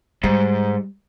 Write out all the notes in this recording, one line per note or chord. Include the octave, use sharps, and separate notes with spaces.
G#2 G3